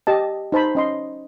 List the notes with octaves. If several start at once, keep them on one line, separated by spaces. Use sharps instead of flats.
G4 D#5 A5
D#4 C5 A5 B5
C#4 D#5 C6